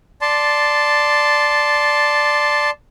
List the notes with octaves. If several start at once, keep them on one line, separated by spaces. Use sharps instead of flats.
D5 A5 C6